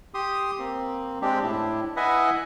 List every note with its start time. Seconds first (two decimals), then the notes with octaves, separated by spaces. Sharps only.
0.14 G4 C6 D#6
0.59 A#3 C4
1.22 G#3 C4 D4 G4
1.43 A2 D4 E4
1.97 E4 B4 D#5 E5 F#5 G#5